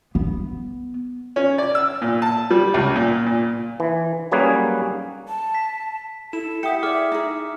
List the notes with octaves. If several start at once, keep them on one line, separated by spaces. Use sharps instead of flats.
B3
C#4
D5
E6
A#2
A5
G3
C#2
A#2
A#2
E3
F#3 G3 A#3 C#4 G#4 B4
A5
B6
E4 A4 E7
G4 E5 F#5 D#6 C#7
G#4 D5 E5 D6 F6
D#4 G#4